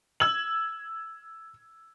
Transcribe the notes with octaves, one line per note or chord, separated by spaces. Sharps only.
E6 G#6 F#7